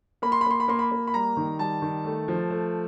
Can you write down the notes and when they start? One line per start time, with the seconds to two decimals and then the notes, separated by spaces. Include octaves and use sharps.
0.22 A#3 B5
0.32 C6
0.41 B5
0.46 A#3 C6
0.60 B5
0.68 A#3 C6
0.79 B5
0.91 A#3
1.07 B5
1.14 G3 A#5
1.37 D#3
1.59 G3 A5
1.82 D#3
2.05 A3
2.28 F3
2.50 A3